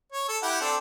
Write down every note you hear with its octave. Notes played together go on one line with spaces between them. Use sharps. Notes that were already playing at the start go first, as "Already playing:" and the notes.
C#5
A4
E4 G4 F#5
C4 D4 A4